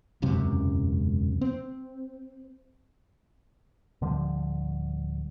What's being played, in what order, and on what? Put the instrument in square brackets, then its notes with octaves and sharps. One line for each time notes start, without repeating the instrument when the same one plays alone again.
[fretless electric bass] E1 C#2 F#2 C3
C4
[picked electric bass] D1 D3 F3 G3